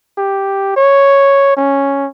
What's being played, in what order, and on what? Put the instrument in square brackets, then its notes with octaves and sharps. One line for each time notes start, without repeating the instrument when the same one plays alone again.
[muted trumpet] G4
C#5
C#4